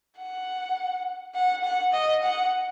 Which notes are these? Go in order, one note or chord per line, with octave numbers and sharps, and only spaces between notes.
F#5
F#5
F#5
D#5
F#5